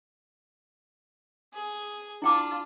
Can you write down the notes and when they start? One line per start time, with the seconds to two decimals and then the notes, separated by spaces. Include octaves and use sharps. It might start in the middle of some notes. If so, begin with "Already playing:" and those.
1.54 G#4
2.22 D4 E4 F4 G5 D6